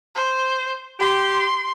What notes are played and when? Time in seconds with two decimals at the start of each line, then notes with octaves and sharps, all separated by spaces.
0.15 C5
1.00 G4 C6